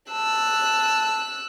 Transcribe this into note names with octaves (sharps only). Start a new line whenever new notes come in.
A5 E6 F#6